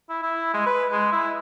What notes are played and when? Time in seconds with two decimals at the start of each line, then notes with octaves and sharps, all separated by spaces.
0.09 E4
0.22 E4
0.54 G#3
0.67 B4
0.92 G#3
1.13 E4